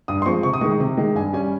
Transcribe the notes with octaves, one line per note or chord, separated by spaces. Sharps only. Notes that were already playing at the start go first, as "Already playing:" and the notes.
G2 D#6
C6
F3 G#3 C4 C#6
C3 C#6
D#6
D#3 G#3 C#6
C#6
C3
D#3 G#3
G2 G#5
G3 C#4 G#5